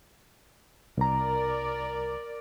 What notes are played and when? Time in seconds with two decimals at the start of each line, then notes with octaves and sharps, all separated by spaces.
0.98 C2 A#4 D5 A#5